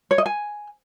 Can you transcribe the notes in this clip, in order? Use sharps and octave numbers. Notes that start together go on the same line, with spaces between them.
C#5
D#5
G#5